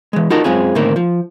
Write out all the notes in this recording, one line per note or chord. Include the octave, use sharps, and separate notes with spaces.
E3 G#3
D#4 F4 F#4 A4 A#4 D#5
F#2 G#3 C4 F4 G#4
A2 D3 D#3 A3 A#3 C4
F3